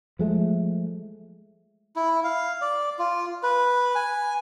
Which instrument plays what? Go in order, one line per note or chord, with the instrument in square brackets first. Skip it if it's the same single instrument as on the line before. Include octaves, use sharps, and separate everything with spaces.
[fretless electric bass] F3 G#3 A3
[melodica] E4
F5
D5
F4
B4
G#5